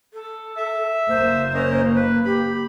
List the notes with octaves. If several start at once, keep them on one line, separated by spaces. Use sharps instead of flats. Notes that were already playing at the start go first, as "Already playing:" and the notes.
A4
E5
F#1 A#3 C5
C#4 A#4 D#5
B4
G4 B5